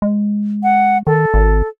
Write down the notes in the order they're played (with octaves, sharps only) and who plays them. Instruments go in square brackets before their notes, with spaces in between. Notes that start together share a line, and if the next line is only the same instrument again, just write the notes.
[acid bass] G#3
[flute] F#5
[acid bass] D#3 [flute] A4
[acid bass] G#1